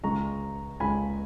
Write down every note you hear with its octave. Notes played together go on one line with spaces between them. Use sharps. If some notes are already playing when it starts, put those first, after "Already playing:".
C#2 C#3 G#3 A#5 C#6
C#2 C#3 G#3 G#5 B5